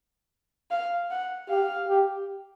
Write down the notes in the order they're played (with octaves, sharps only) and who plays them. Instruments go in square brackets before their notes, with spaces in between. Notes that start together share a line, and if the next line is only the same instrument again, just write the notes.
[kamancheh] F5
F#5
[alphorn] G4 [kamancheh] F5
[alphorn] G4